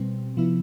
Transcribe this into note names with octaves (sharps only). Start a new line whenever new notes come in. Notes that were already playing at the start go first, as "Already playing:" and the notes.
Already playing: B2 G3 C4
C3 F3 B3 E4